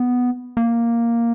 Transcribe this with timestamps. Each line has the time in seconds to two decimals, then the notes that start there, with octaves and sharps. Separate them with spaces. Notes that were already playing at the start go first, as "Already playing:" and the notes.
Already playing: B3
0.57 A#3